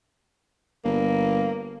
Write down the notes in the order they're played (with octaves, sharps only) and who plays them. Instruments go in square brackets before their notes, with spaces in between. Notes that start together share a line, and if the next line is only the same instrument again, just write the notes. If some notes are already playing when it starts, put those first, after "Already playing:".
[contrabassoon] G1 [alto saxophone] A#3